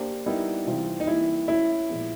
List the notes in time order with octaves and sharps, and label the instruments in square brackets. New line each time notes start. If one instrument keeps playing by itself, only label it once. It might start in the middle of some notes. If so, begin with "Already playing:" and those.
Already playing: [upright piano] A#3 D4 G4 C5
[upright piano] G3 B3 E4 G4 A#4 [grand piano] D#4
[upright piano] C3 E3 G3 C4 F4
[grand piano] D#4
[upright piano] E3 G3 A#3 [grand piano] E4
[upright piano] A3 C#4 F#4 A4 [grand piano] E4
[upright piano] A#2 F3 G#3 B3